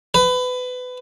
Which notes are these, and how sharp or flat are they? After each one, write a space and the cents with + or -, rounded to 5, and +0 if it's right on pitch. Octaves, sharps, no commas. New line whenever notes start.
B4 +25